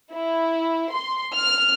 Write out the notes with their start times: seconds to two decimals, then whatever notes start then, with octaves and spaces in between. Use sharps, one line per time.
0.15 E4
0.95 C6
1.36 F6